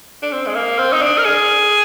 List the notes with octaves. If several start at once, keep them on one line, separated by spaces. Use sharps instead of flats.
D4
C4
G#3
A#3
C4
D#4
D4
A#4
G#4